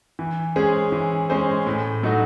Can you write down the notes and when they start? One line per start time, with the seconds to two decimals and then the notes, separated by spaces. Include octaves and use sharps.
0.19 E3
0.56 G#3 C#4 G#4 C5
0.92 E3
1.30 G#3 C#4 G#4 C5
1.66 A2
2.03 F#3 A3 D#4 F#4